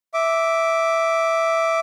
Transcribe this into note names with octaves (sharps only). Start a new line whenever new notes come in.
E5 D6